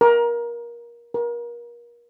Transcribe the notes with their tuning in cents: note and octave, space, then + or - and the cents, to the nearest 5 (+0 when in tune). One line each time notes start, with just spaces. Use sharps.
A#4 +20
A#4 +30